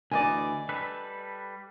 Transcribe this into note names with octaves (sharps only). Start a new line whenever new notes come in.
D2 E3 D5 D#5 G#5
G3 A4 B4